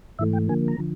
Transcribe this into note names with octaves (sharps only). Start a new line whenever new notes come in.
G#2 E3 A3 E5
G5
D3 F3 A#3 G#5
A#5
D3 F3